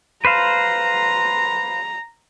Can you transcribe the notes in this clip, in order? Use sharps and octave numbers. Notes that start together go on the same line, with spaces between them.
B4 C5 F5 A#5